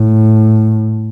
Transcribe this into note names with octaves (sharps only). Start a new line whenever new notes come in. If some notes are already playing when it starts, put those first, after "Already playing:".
Already playing: A2